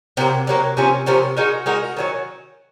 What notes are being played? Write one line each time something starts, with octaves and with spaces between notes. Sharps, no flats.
C3 F#3 A#3
C3 F#3 A#3
C3 F3 A#3 C#4
C3 F3 A#3 C#4
G#3 D#4 F#4 A#4
G#3 D#4 F#4 A#4
D#3 F#3 C#4